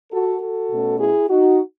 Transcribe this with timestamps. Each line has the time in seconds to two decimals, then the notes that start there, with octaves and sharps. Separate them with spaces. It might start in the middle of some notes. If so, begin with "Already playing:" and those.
0.12 F#4 A4
0.41 F#4 A4
0.70 B2 A3 C#4
1.00 E4 G#4
1.29 D#4 F#4